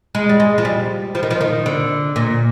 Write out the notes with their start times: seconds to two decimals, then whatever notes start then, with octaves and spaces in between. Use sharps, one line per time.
0.15 G#3
0.29 G3
0.40 G#3
0.58 F3
0.65 G3
1.15 F3
1.23 D#3
1.31 F3
1.41 D#3
1.66 D3
2.16 A#2